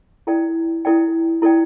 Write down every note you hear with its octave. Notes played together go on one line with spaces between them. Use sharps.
E4 A4 D5 G5
E4 A4 D5 G5
E4 A4 D5 G5